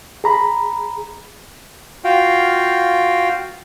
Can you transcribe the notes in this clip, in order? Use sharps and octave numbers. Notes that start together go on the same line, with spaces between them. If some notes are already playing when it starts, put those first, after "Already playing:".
G#4 A#5 B5
F4 F#4 F5 G5